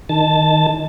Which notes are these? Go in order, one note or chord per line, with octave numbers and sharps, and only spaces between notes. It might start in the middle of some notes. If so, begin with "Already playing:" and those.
D#3 A5